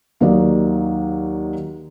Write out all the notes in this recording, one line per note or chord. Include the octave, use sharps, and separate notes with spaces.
D#2 D#3 F#3 D5 D#5